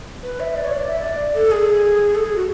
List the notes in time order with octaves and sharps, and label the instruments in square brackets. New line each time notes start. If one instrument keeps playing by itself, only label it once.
[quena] B4
E5
D5
C#5
D5
E5
D5
A4
G#4
A4
G#4
F#4